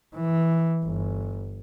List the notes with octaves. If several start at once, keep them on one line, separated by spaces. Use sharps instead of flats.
E3
G1